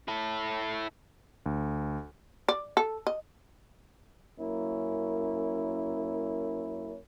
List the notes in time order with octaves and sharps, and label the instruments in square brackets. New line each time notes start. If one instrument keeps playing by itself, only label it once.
[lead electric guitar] E4 A4
[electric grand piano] D2
[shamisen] D5
A4
D#5
[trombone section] F#2 A#3 C#4 E4